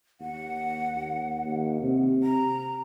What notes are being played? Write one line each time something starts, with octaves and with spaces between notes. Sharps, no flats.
D#2 F#5
D#2
D#2
C3
A#5